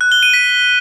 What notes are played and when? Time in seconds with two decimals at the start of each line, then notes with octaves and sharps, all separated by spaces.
0.01 F#6
0.12 G7
0.23 D#7
0.34 B6